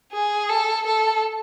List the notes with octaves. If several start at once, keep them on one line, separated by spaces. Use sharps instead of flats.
G#4
A4
A4